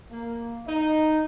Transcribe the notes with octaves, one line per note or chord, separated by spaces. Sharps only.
A#3
D#4